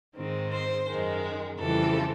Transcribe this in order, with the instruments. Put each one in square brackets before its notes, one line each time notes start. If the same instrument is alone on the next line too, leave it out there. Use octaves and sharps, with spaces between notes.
[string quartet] G#2 D#3 G#3 C4
C5
F#2 D#3 G#3
F2 C#3 E3 G3 C4 A4